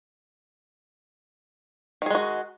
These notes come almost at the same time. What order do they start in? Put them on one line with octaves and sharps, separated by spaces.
D#3 G#4 G#3 F#4